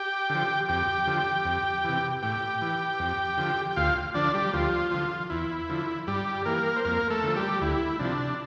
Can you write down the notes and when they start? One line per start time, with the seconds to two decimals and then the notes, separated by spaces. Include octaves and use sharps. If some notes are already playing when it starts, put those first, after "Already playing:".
Already playing: G4 G5
0.30 D3 F3
0.69 F2 G4 G5
1.07 D3 F3
1.45 F2
1.85 C3 E3
2.22 A2 G4 G5
2.62 E3
2.99 F2
3.38 D3 F3
3.71 G5
3.76 D2 F4 F5
4.14 D3 F3 D4 D5
4.34 G3 G4
4.53 D2 F3 F4
4.91 D3 F3
5.30 E2 E4
5.69 D3 F3
6.07 G2 G3 G4
6.45 E3 A#3 A#4
6.76 C5
6.85 F2 A#3 A#4
7.10 A3 A4
7.23 D3 F3
7.36 G3 G4
7.61 D2 E4
7.99 C3 F3 D4